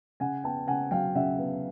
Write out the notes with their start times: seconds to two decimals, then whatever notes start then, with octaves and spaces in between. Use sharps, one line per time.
0.20 C#3 F#5 G#5
0.44 B3 G5 A5
0.68 C#3 F#5 G#5
0.91 F#3 F5 G5
1.15 C#3 E5 F#5
1.38 B3